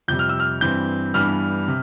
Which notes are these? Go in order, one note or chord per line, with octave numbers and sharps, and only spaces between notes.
F2 C3 G3 G6
F6
E6
F6
G2 E3 G3 C4 G6
G2 E3 G3 B3 D4 F6
C3